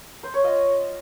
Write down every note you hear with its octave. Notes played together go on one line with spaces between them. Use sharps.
C5
C#5
F4 D#5